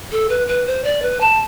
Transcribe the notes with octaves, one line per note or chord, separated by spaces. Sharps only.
A4
B4
B4
C5
D5
B4
A5